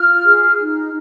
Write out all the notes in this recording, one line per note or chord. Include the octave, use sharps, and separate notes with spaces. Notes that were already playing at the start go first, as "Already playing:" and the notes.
Already playing: F4 F6
G#4
D#4